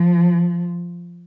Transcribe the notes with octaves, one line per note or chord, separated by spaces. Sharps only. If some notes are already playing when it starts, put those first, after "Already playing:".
Already playing: F3